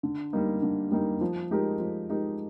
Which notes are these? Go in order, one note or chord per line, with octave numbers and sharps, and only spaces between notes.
D3
G3 A#3 D#4
D3
G3 A#3 D#4
F3
G#3 D#4 G4 A#4
F3
G#3 D#4 G4 A#4